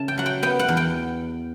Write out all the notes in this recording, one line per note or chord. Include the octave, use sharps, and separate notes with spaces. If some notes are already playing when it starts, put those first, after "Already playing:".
Already playing: C#3 A5
G5
F#3 F#5
G5
B3 G5
F#5
E2
G5